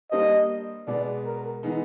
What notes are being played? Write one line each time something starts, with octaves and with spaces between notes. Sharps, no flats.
G3 A#3 D4 G4 C5 D#5
B2 G#3 B3 D5
A#4
E3 G#3 B3 D#4